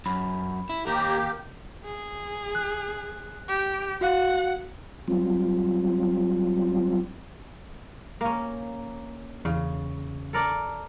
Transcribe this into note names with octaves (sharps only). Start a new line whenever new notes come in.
F#2 B5
E4
D#2 A#3 G4 A#4
G#4
F#6
G4
F#4 F5 F#5 F#6
F#3 G3 C4 F4
A#3 C#4
E2 C#3
A4 A#4 D5